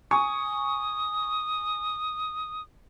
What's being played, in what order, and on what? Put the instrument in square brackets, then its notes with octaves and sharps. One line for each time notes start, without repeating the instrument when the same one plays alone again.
[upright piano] G#5 C#6 [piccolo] D#6